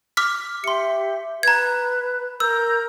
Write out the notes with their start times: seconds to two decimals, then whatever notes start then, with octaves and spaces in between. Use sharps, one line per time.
0.17 D6 F6 B6
0.64 G4 E5 C6 C#7
1.43 B4 A#5 G#6
2.40 A#4 A#5 E6 G6